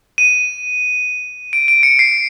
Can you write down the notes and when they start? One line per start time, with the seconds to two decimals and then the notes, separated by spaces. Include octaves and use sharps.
0.18 D#7
1.53 D7
1.68 D7
1.83 C#7
1.99 C7